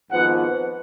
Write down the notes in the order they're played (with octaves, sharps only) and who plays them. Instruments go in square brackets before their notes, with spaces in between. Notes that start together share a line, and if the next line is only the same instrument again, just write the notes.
[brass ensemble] G#1 G#2 F3 B3 F#5